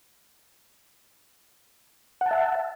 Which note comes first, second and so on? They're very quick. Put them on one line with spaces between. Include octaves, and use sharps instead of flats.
F#5 A5 E5